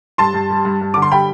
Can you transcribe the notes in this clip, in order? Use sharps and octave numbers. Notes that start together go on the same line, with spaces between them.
G2 A5 C6
G2
G3
G2
G2
D3 D6
C6
G3 G5 B5